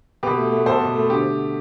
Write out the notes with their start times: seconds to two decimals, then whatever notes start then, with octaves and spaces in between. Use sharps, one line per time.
0.23 B2 G4 B4
0.37 A3
0.52 A3
0.66 B2 A4 C5
0.81 B2
0.95 A3
1.10 D3 G4